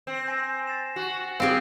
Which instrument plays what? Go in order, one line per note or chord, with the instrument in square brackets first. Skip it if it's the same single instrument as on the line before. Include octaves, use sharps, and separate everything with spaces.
[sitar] C4 [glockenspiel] E7
[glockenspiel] G#5 A#6
A6 C7 E7
[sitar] F#4
[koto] C4 G4 [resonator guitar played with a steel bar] G#4 F5